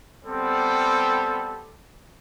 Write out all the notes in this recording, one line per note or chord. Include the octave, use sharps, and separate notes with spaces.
G3 B3 C4 A4